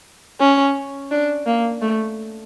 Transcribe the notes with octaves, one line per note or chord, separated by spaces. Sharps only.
C#4
D4
A#3
A3